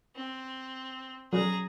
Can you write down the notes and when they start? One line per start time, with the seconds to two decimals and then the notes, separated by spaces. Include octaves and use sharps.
0.16 C4
1.33 F#3 G#4 A#5